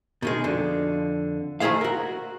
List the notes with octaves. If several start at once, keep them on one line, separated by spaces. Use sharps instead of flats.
B2 D#3 G#3
F2 D3
D#3 F3 E4 G#4 C5 F5
F#4 A#4